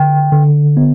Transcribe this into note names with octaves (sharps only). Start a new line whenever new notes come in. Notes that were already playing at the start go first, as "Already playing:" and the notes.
Already playing: D3 G5
D3
B3